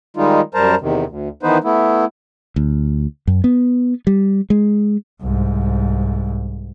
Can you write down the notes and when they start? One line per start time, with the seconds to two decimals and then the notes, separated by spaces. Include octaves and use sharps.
0.17 D#3 G3 G#3 D#4 F4
0.54 F#2 G3 A#4 C5 A5 A#5
0.81 E2 C3 D#3
1.07 D2
1.43 D#3 E3 B3 D#4 B4 C5
1.64 A3 B3 E4
2.56 D2
3.27 F#2
3.44 B3
4.07 G3
4.50 G#3
5.22 C2 G#2